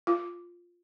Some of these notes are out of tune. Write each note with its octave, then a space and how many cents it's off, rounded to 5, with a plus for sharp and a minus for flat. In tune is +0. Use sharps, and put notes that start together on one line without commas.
F4 +5